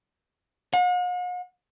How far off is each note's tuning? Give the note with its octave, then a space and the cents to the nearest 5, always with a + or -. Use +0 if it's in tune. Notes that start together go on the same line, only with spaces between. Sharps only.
F#5 -45